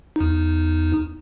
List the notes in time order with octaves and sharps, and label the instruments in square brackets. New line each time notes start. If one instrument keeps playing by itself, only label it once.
[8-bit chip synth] E2 D#4